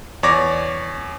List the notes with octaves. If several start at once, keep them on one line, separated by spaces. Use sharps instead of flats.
E2 C#5 D5 D6 A#6